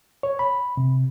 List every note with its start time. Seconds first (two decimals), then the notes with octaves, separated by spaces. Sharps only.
0.23 C#5
0.39 B5
0.77 C3